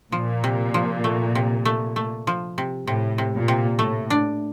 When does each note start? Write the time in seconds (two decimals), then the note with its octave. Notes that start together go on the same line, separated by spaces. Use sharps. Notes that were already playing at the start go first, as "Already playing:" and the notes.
0.12 A#2 F3
0.44 C3
0.74 F3
1.04 A3
1.35 C3
1.65 A3
1.96 A3
2.27 F3
2.58 C3
2.87 A2 C3
3.18 C3
3.34 A#2
3.48 C3
3.79 A2 A3
4.10 D4